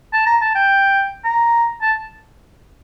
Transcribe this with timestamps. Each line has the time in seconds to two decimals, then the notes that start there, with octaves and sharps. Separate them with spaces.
0.13 A5
0.26 A#5
0.41 A5
0.55 G5
1.24 A#5
1.81 A5